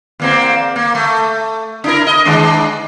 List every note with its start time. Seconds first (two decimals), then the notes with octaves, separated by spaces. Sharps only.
0.20 E2 A#3 C4
0.76 A#3
0.95 A3
1.84 D4 E4 A#4
2.07 D#5
2.25 D#3 G#3 D4